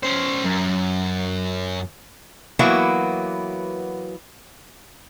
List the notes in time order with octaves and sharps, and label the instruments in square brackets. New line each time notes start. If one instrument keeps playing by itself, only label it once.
[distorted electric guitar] C#4 C5
F#2
[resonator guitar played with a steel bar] E3 F#3 A#3 B3 E4 F#4